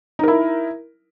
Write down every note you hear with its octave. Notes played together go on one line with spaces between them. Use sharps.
D#4 E4 A#4